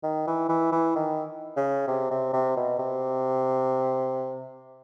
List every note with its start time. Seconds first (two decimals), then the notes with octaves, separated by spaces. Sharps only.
0.03 D#3
0.27 E3
0.49 E3
0.72 E3
0.95 D#3
1.56 C#3
1.87 C3
2.11 C3
2.33 C3
2.56 B2
2.79 C3